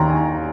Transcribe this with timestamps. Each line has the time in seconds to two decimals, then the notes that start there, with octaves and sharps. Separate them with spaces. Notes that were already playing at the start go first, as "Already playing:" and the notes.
Already playing: D#2 D#3 A#5 C6
0.10 G#5